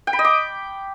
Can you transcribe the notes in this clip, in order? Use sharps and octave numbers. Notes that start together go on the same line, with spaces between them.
G5
B5
D#5
D6